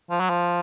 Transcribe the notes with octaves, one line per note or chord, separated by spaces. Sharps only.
F3
F#3
F3